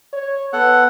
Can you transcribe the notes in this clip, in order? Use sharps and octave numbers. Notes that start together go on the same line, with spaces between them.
C#5
B3 A4 F#5